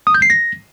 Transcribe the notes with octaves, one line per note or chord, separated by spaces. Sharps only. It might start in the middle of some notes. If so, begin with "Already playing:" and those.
D#6
G6
C7
A#6